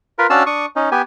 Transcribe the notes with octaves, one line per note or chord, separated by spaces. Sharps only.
F4 A#4 B4
C#4 D4 F#4 F5 A5 E6
D4 C#6 D#6
C#4 D#4
B3 G4 G#5